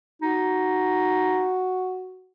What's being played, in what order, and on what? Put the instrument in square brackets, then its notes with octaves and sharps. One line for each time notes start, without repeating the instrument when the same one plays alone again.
[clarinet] D#4 [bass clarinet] F#4